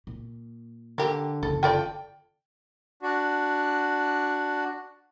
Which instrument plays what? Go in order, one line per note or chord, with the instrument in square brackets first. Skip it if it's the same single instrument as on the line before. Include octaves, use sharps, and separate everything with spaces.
[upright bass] A#2
[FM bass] D3 [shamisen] A#3 G4
[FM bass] F#1 [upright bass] D3 E3 [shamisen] A4
[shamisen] F4 A4 D5 [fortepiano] G5
[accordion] D4 F#4